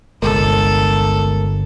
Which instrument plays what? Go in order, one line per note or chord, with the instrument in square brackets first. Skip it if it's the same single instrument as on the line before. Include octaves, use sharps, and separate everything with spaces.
[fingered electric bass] G1 [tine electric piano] C2 G#3 A#4 [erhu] A4